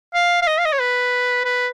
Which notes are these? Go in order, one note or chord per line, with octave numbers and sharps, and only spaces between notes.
F5
F5
D#5
F5
D#5
C#5
B4
B4